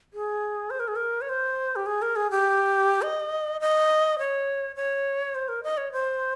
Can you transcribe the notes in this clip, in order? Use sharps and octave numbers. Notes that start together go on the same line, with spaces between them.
G#4
C5
A#4
G#4
A#4
C#5
C5
G4
G#4
A#4
G#4
G4
D#5
D#5
C#5
C#5
C5
A#4
D#5
C#5
C5